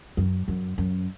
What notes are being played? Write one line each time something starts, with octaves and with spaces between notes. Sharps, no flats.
F#2
F#2
F#2